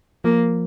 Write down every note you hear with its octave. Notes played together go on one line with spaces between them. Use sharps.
F3 A#3